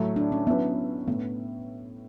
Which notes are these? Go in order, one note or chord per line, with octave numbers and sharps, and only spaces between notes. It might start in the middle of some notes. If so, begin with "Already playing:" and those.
Already playing: A2 F#3 A3 E4
D4
C#4
F#3 B3 C#4 E4 B4 E5
A2 B3